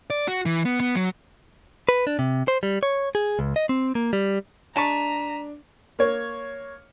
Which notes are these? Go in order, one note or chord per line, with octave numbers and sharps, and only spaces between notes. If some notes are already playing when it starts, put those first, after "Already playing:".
D5
F#4
E3
B3
B3
F#3
B4
D4
C3
C5
G3
C#5
G#4
C#2
D#5
C4
A#3
G3
G#3 D4 A5 A#5 C#6 B6 D#7 E7
A#3 C#5